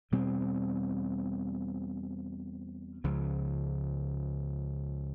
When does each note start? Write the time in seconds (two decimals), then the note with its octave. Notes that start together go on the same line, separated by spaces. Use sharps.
0.12 E2 B2 G3 C4
3.04 C#2 C#3 F3